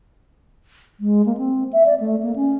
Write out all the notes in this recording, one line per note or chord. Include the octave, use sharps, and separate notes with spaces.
G#3
A#3
C4
E5
D5
A3
A#3
C#4